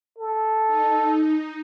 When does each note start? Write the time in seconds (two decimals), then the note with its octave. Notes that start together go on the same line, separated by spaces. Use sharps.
0.19 A4
0.68 D#4